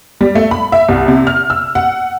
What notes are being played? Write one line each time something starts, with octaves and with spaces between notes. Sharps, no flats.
G3
A3
B5
E5
C2
C3
F6
E6
F#5